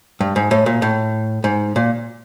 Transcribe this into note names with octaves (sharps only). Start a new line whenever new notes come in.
G2
G#2
A2
A#2
A2
G#2
A#2